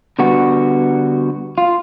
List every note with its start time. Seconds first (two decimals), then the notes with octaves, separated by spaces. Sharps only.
0.19 D3 G3 B3 F#4
1.58 F4